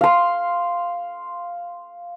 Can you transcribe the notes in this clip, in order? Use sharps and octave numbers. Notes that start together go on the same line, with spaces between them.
F5 C6